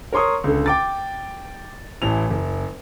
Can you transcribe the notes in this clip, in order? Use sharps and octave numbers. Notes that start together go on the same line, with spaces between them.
A#4 C#5 C6 C#6 D#6
C#2 D3 A4
G5 D6 A6
A1 E3 A5 F7
F#1